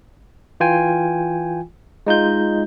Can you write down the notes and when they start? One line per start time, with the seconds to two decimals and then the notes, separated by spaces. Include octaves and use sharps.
0.60 E3 F4 G5 G#5
2.07 G#3 D#4 F4 G6